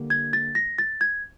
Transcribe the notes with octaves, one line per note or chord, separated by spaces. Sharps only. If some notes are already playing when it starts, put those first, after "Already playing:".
Already playing: D3 G3 A#3
G#6
A6
A#6
A6
G#6